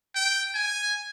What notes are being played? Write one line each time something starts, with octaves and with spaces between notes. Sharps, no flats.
G5
G#5